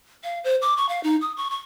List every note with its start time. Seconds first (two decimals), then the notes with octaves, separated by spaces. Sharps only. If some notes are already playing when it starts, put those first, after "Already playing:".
0.24 F5
0.44 C5
0.62 D6
0.77 C#6
0.89 F5
1.04 D#4
1.21 D#6
1.37 C#6
1.51 C#6